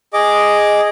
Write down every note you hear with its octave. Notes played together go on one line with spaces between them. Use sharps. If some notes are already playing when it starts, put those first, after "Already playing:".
G#4 D#5 D6